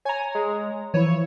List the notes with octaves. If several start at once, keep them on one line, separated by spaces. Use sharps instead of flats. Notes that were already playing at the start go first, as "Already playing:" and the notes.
C#5 G#5 A#5
G#3
E3 F3 E4 C#5